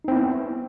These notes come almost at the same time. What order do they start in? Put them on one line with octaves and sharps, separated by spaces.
D#4 C4 E4 B3